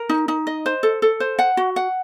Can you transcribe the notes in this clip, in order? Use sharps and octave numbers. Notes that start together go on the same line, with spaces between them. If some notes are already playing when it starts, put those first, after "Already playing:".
Already playing: A#4
D#4
D#4
D#5
C5
A4
A4
C5
F#5
F#4
F#5